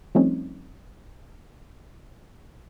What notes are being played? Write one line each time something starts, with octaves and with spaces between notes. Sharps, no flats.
F3 G3 A3 C4 C#4 D#4